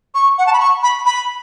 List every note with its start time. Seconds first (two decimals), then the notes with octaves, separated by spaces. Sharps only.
0.14 C#6
0.38 F#5
0.47 A5
0.53 B5
0.60 C#6
0.83 B5
1.06 B5